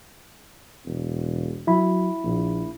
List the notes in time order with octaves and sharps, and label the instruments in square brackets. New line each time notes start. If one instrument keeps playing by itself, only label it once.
[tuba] E1
[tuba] F#3 [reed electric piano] E4 B5
[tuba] A#1